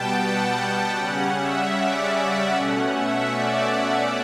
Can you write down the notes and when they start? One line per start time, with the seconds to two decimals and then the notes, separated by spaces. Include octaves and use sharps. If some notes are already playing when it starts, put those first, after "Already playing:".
Already playing: B2 G3 B3 G5 A5
0.16 F#5
0.95 C#3 G3 C#4 F#5
1.36 E5
1.75 D5
2.16 E5
2.54 B2 A3 C#4 F#5
2.95 E5
3.34 D5